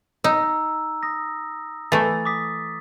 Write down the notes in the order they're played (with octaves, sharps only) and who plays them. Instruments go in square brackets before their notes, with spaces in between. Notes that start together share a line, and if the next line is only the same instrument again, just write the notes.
[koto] D#4 [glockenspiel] A#5 E6
[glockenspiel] D#6 A#6
[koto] E3 A3 [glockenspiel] A6
[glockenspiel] D6 D#6 B6